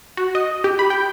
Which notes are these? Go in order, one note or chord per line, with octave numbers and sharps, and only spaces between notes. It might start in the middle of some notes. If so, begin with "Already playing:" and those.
F#4
D#5
G4
B5
G5